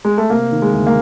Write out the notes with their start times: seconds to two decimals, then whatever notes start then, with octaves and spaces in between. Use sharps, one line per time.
0.05 G#3
0.18 A3
0.30 C3 A#3
0.52 D#3
0.62 G#3
0.74 D2
0.87 A#3